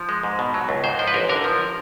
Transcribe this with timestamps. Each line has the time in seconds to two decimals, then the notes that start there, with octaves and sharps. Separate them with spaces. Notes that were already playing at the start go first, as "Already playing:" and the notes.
Already playing: F3
0.09 G#3
0.23 G#2
0.39 B2
0.54 F#3
0.69 C#2
0.84 G#2 C5
0.99 F3 C5
1.08 B4
1.14 A1 A#4
1.29 D3 A#4
1.44 F3